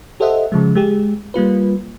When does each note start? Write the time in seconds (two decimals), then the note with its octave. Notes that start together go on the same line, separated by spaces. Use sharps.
0.20 G4 A4 C5 D#5 E5 F#5
0.52 C#3 F3 G#3
0.75 G#3 G4 G#4
1.34 G3 A#3 F4 B4